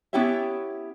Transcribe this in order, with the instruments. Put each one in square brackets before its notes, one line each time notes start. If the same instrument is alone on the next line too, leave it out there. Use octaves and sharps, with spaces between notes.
[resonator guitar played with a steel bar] B3 C#4 E4 G4 C#5 E5